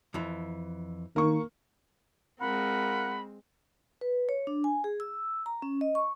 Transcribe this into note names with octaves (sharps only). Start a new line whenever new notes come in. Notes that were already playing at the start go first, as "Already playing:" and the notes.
F2 E3
D#3 A#3 C#6
G#3 C4 F4 A#4 F#5 B5
B4
C#5
D4
G#5
G#4
E6
A#5
C#4
D#5
C#6